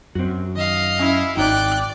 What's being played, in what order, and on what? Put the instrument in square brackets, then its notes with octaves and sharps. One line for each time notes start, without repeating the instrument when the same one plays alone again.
[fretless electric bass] F#2 [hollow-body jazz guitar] C4 F#4
[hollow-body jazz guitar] D#3 [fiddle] D#5 F5
[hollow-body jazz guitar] C#4 G#5 [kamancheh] E4
[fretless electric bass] G#1 [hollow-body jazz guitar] D#4 F#4 [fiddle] D5 [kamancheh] G5 F#6